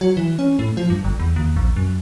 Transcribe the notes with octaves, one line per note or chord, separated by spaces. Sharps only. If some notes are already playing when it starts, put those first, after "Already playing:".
F#3
E3
C#4
A2
F3
G2
G1
E2
D#2
A#1
F#2